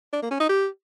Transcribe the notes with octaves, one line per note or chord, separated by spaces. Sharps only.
D4
A#3
C#4
D#4
G4